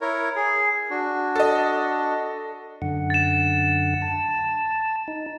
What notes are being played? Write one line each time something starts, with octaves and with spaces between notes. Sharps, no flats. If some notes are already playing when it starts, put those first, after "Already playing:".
E4 A#4 C#5
G#4
D4 F#4
A4 D#5
F#2 D3 F#5
A6 E7
A5
D#4